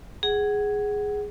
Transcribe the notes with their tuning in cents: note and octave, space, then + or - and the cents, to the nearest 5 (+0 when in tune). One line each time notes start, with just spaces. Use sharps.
G#4 +0 F#5 +20